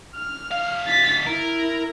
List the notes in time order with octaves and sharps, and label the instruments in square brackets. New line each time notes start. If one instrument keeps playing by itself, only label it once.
[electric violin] F6
[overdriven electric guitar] D2 F5
[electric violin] A6 B6
[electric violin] E4 [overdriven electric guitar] A#4